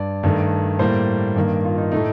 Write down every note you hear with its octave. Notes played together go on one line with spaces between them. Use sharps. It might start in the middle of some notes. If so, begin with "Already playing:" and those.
Already playing: G2 D5
G2 D#3 A3
A2 G3 A#3 C5
G2 D#3 A#3
F4
D#4
A2 A3 D#4